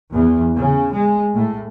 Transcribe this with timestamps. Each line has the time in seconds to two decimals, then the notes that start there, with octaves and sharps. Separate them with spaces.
0.11 E2
0.54 C#3
0.91 G#3
1.35 A2